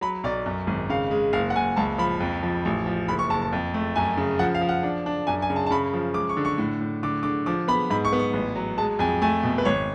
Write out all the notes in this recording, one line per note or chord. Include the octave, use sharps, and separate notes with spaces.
F#3 B5
B1 D5
F#2
G#1
C#3 F5
G#3
F#1 F5
F#5
F#1 G#5
C#2 A5
F3 B5
F2
F3
A1
F3
F#1 B5
C#6
F#1 A5
A5
F2
A3
F#2 G#5
C#3
F3 F#5
F5
F3
F#5
D4
D4
F#2 G#5
G#5
C#3
A5
A5
C#3 B5
F3
G#3 D6
C#6
D3
C#6
A2
A2
D3 D6
D3 D6
F3 D6
B3 B5
G#2 B5
C#6
B3
C#6
A1
F#3
G#3 A5
F2 G#5
A3 G#5
B2
B4
G#1 C#5